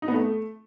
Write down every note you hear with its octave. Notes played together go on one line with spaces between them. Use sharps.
D#4
B3
A3